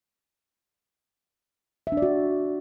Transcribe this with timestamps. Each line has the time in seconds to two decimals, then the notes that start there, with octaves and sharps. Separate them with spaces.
1.87 E5
1.92 D4
1.97 D5
2.02 F#4